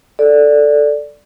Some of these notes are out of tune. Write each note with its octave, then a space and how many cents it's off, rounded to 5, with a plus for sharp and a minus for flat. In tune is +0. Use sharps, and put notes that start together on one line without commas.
A4 +5 D5 +0